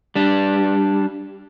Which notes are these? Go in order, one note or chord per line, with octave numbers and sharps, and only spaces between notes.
G3 D4